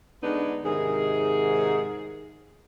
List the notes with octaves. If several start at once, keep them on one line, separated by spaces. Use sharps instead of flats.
D3 G#3 B3 D4 D#4
G#2 C3 D#3 G#4